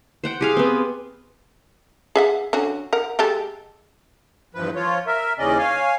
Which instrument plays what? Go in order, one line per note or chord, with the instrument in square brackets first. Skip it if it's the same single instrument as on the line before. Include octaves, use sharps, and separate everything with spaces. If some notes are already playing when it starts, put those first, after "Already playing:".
[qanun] C5 F#5 G5
G4 G#4 F5
B3 C4
[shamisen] G#4 E5 F#5
D3 C#4 F#4
A#4 F#5
G#3 G4 A4
[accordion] E2 G2 F3 B4
F3 F4 C#5
A#4 E5
D#2 C#3 E3 C#4 D5 D#5
C#5 F5 G#5